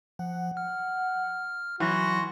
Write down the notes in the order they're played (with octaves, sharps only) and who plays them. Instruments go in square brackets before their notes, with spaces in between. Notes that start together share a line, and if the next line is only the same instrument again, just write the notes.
[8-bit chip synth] F3 [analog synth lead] F#5
[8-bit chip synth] F6
[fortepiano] E3 [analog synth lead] F#3 [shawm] F#4 [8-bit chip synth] C6 F#6